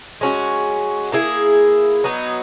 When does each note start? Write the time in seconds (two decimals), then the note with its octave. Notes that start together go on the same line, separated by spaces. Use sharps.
0.21 G#3 C#4 F#4
1.12 A#3 E4 G#4
2.04 F#3 B3 D#4